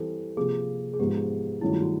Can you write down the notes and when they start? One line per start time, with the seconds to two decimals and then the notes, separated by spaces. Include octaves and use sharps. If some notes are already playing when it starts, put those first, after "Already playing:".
Already playing: E3 G3 C4 A4
0.37 C3 F3 A#3 G#4
0.94 G#4
0.99 G#2 F3 G#3 B3 G4
1.15 G#4
1.61 G2 D#3 F#3 A3 C#4 E4
1.73 F4
1.82 F#4